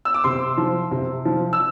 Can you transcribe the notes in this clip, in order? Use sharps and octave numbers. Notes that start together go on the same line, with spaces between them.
E6
D6
C3 C6
F3
C3
F3
E6